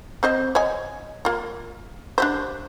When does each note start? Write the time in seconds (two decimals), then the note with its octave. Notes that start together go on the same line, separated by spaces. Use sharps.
0.23 C4 C5 D#5
0.55 C#5 D#5 G#5
1.25 A#3 F4
2.18 D4 G4 C5